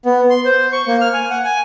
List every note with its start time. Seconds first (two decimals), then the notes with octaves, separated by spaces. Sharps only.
0.05 B3
0.30 C6
0.45 C5
0.72 C#6
0.87 A#3
1.01 F6
1.13 G#5
1.30 F#5
1.45 G#5